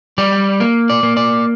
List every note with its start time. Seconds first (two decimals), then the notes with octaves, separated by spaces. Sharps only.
0.18 G3 D5
0.60 A#3
0.90 D5
1.03 A#3
1.17 D5